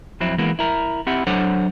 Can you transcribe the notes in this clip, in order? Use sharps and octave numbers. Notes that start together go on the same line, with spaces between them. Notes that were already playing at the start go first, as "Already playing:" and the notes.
F2 F#3 C4 E4
E3 G#3 A#3 B3
E4 A#4
C4 E4 G4 F#5
F#3 D4 A4 C5 C#5 F#5